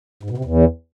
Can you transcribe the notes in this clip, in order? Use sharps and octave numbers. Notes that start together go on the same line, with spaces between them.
G#2
B2
C3
E2